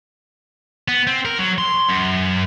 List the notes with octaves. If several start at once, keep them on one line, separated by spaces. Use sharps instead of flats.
B3
C4
A#4
F#3
C6
F#2